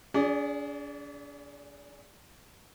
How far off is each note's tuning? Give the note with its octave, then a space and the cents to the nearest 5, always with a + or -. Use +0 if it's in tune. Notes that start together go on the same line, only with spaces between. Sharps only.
D4 -45 G#4 +0 D5 +0